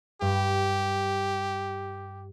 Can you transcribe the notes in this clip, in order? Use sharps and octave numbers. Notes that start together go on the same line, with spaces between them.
G2 G4